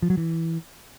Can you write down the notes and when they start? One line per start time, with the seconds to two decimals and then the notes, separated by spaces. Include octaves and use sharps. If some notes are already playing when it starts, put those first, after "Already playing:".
0.02 F3
0.10 F#3
0.17 E3